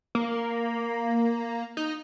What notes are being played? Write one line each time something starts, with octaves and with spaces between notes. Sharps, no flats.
A#3
D#4